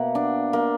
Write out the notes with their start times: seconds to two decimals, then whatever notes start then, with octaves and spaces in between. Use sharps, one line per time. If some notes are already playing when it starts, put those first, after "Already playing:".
Already playing: B2 A#3 E5 F#5
0.15 D4
0.53 A#3